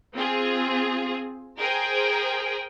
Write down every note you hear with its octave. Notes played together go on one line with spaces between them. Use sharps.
C4 F4 G#4
G#4 A#4 C5 G5 G#5